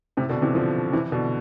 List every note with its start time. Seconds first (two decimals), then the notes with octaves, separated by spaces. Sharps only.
0.17 A2 C3
0.29 B2 D3
0.42 C3 E3
0.55 D3 F3
0.93 C3 E3
1.12 B2 D3